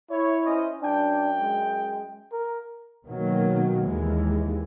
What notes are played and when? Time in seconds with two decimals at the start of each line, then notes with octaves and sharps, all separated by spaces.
0.11 E4 C#5
0.45 C#4 C5 D#5
0.82 F#2 D4 G5
1.39 G#3
2.33 A#4
3.05 B2 D#3 F#3 A#3
3.85 D#2 E3 G#3